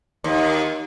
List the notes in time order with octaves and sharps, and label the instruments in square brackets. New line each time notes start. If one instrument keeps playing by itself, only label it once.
[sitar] D#2